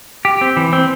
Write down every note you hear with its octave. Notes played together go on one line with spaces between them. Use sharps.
G4
C4
E3
C4